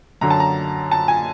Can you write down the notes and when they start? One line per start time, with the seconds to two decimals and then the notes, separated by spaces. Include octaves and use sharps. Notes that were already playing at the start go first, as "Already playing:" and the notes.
0.21 F#2 D3 F#3 A#5
0.30 A5
0.40 A#5
0.91 A5
1.08 G#5